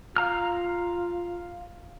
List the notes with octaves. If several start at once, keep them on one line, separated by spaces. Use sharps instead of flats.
F4 F5 A#5 F6